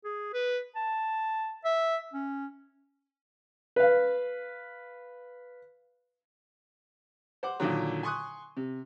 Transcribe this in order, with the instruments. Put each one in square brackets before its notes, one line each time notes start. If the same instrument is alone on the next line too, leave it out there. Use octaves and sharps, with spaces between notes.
[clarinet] G#4
B4
A5
E5
C#4
[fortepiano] B4 F5
C5 F#5 D6
A#2 D3 D#3 F#3
G#5 C6 C#6 D#6 F#6
C3